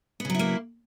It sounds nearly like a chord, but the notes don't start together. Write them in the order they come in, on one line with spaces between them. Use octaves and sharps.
B3 C#3 F#3 E4 A#3